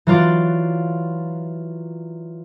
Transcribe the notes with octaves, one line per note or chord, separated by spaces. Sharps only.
E3 F#3 F4 D5